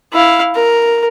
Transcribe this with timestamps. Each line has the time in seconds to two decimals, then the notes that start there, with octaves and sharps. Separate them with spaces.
0.13 E4 F5
0.55 A#4